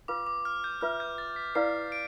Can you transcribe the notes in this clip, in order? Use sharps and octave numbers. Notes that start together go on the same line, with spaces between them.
F4 B4 F5 D6
D6
F6
G6
F4 B4 E5 F6
G6
A6
B6
E4 B4 D5 F5 C7
D7